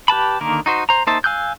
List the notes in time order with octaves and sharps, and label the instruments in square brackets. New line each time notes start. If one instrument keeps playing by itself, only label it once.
[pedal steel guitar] G4 B4 A5 B5
D3 D#3 A#3 A#4
D#4 F#4 C5
C5 A#5
A#3 D#4 C5 E5 A5
F5 G#5 E6 F#6 G6